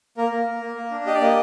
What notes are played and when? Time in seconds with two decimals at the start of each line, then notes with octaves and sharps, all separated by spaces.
0.18 A#3 A#4
0.32 A#3
0.47 A#3
0.61 A#3
0.76 A#3
0.91 D4
1.06 G4 D#5
1.14 D5
1.21 A#3 D#5